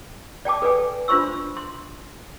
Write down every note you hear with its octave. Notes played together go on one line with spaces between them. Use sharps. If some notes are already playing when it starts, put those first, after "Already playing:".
D5 G5 A5 D6
A4 B4 D5 G#5
D4 F4 C5 C6 C#6 E6
C6